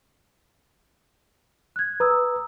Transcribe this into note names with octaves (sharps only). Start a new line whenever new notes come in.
F#6 G#6
B4 A#5 D#6 E6